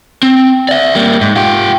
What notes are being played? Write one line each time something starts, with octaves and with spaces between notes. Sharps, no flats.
C4
D5 E5
G3 A#3
G#2
F4 G4